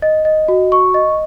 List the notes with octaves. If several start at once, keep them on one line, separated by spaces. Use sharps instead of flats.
D#5
D#5
F#4
C#6
D#5